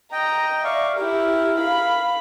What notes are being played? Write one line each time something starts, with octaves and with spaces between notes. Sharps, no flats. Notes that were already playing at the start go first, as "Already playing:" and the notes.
D#5 G5 A#5
D5 E5 F5 C#6
E4 G4 A#4
F5 B5